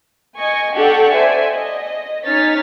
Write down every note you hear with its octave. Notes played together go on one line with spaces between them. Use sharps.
D#5 G#5 C#6
D4 G4 A4 F#5 G5 C#6
C5 D5 E5 G#5
D#5
C#4 D#4 C#5 F6 A6 B6